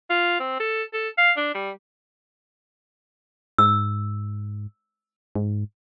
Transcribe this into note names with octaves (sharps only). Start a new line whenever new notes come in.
F4
C4
A4
A4
F5
D4
G3
G#2 E6
G#2